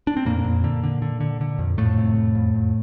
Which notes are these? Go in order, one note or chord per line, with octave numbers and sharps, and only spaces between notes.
D4
C4
F2 A#2 A#3
F2
D3
D3
D3
D3
D3
F2
F2 A2 A3
C3
F2
F2
F2